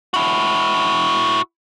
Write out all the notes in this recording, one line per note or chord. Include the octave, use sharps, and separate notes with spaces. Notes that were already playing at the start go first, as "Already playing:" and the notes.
E4 F#4